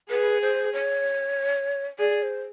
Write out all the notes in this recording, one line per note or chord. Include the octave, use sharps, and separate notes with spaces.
G#4 B4
C5
C#5
G#4 D5
C5